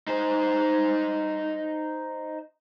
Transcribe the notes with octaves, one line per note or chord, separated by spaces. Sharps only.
D#4 C5